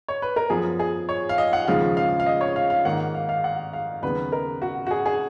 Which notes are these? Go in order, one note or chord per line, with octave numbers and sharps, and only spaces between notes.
C#5
B4
A#4
F#2 F3 B3 G#4
G#4
C#5
F5
D#5
F#5
D#2 C#3 F3 G#3 F5
F5
F5
D#5
C#5
F5
F5
G#2 D#3 A#3 F#5
F5
F5
F#5
F5
D#2 C#3 F#3 B3 B4
A#4
F#4
F#4
G#4
G#4